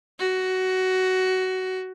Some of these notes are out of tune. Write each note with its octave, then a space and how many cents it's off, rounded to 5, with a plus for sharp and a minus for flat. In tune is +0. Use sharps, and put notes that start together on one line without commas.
F#4 +15